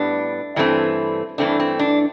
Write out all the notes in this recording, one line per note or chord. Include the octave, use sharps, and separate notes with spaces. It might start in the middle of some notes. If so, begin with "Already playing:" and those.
Already playing: A2 G3 B3 D4
G2 E3 A3 C4
G2 E3 A3 C4 D4
C4
D4